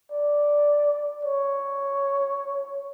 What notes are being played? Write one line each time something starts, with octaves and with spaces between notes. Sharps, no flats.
D5
C#5